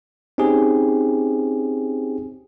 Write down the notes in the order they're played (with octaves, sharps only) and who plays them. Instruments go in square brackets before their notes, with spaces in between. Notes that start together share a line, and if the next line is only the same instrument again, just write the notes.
[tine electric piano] C4 C#4 D#4 G4 G#4